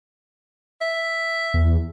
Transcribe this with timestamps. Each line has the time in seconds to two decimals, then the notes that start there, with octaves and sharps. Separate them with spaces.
0.81 E5
1.54 E2